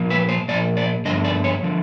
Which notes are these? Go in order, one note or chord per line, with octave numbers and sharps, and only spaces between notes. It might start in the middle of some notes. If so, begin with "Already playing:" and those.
Already playing: A#2 F3
B4
C5
A#2 F3 D5
D5
G2 D3 F3 D#5
D5
C#5
D3 F3